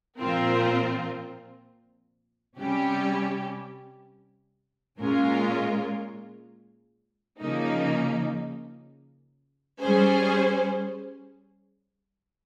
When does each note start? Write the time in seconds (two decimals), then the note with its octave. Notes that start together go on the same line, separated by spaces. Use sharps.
0.20 A#2 F3 C4 F4 A#4
2.59 C3 G3 C#4 G4
5.00 A#2 G#3 C#4 F4 A#4
7.40 C#3 F3 A#3 D#4
9.80 G3 C#4 G#4 C5